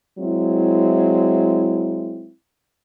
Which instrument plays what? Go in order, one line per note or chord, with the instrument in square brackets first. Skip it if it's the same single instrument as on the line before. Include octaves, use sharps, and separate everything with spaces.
[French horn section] F#3 G#3 C4 E4